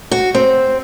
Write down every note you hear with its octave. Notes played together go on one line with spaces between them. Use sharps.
F#4
C4